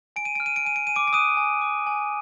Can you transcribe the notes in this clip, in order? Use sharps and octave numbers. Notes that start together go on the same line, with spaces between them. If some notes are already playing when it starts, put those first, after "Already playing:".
G#5 D7
D#7
F6 D7
D#7
D7
G#5 D#7
D7
G#5 D#7
D6 D7
D7
D#6 F#6 D#7
G#5
D6
G#5